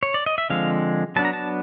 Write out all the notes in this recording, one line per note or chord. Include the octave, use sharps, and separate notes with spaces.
C#5
D5
D#5
E5
D3 F3 G#3 C4 F5
F#3 B3 D4 A5
A#5
A5